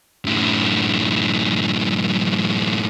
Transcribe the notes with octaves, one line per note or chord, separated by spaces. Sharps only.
F#2 A2